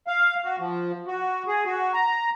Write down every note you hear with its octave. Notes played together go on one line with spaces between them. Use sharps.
F5
F#4
F3
F#4
G#4
F#4
A#5